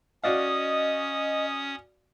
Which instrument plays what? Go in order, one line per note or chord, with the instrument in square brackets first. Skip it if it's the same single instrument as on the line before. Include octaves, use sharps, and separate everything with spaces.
[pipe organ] C#4 D#6 [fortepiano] F#4 D5 F5 [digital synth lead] D#5